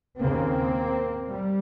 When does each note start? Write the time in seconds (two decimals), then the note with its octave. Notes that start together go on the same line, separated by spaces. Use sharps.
0.21 D#2 C#3 A#3 C4
1.31 G3